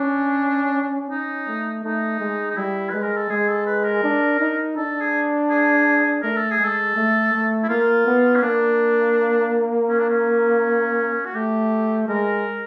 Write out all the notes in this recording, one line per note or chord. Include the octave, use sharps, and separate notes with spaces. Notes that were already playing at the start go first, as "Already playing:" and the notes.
Already playing: C#4 D4
C#4 D#4
A3
A3 D#4
G#3
D#4
G3 E4
G#3 B4
A#4
A4
G#3 G#4
A4
B4
A#4
D4
D#4
D4 A4
G#4
G#4
A3 A#4
A4
G#4
G#3 A4
A3
A3
E4
A#3 F4
B3
C#4
A#3 D4
C#4
D4
C#4
F#4
A3 G4
G#3 A#4